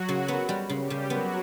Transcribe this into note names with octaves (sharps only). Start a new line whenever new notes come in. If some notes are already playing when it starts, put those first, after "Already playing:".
Already playing: F#3 F#4
C#3
B3
G3
C#3
G3 G4
C#3
F#3 B3 F#4